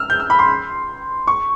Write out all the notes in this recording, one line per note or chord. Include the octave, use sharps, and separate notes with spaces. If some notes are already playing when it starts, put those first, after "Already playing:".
Already playing: E6 F6
G6
E6
B5
C6
C#6